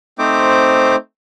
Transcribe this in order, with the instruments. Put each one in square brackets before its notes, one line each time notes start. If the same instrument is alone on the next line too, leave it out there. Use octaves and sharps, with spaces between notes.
[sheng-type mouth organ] A3 C4 D#4 C5 D6